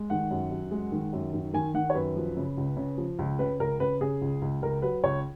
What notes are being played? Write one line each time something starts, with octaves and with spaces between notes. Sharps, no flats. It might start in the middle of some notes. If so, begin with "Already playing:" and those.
Already playing: G#3
D#3 F#5
F#2
F#2
G#3
D#3
F#2
D#3
D#3 G#5
D#3 F#5
C#5
F#2 B4
F3
C#3
C#2
C#3
F3
C#2
C#3 B4
C#2 A#4
C#3 B4
C#3 G#4
C#2
C#2
C#2 A#4
F#3 B4
C#2 C#5